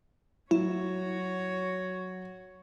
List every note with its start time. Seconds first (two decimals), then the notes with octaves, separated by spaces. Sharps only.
0.51 F#3 E4 F#4 C#5